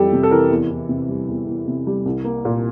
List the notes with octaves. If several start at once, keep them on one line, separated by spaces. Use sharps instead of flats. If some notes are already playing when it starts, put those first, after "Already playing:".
Already playing: F2 E3 G3 G4 A4
C3
A4
E3 A#4
E2
E2
C3
G3
E2
E2
C3
G3
C2
A#3
A#2